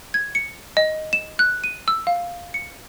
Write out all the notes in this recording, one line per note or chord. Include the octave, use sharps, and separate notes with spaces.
G#6
C#7
D#5
E7
F#6
D#7
E6
F5
C#7